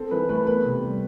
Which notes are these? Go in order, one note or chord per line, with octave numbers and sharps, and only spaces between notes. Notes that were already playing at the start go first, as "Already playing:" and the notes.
Already playing: C4 A4
E3 B4
A3 B4
B3 B4
C3
G3